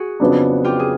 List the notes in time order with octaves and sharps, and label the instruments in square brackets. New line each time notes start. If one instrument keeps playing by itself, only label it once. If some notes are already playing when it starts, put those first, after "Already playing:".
Already playing: [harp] F#4 G#4
[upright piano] F2 C#3 F#3 B3 D4
[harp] F4 G4
G#4